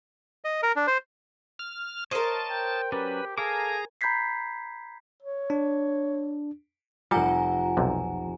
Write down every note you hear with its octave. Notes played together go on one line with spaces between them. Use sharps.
D#5
A#4
D4
C5
F6
A#4 C5 C#5 D#5 F5 A5
G5
F#3 C#4 G4 B4 D5
G#4 A4 F5 G#5 A#5 D6
A#5 B5 G6 G#6 B6 C7
C#5
D4
F1 G3 F4 F#5 G#5 A#5 C#7
B1 C3